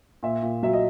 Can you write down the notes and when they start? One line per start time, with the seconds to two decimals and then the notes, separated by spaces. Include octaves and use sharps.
0.23 A#2 E5
0.42 A#2
0.63 F#3 E5
0.73 D#5